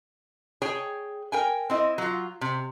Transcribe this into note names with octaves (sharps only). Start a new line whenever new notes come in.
G#4 C#5 G5
A#4 G5 G#5
C4 E4 D#5
F#3 F4
C3